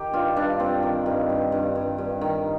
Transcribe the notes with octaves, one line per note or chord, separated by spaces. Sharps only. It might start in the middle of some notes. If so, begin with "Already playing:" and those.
Already playing: D#3 G4
G2 F4
G2 D4
G2 C4
D#3
G2
G2
G2
G2
G2
D#3